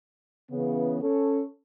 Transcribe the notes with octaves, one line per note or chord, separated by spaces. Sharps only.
C#3 E3 B3
C#4 A4